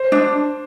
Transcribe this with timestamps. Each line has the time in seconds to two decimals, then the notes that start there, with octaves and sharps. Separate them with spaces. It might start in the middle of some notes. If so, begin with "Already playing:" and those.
Already playing: C5
0.12 D4